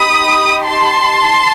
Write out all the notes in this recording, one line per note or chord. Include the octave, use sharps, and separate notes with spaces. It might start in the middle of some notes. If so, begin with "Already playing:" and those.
Already playing: D#4 G4 B5 D#6
A5 C6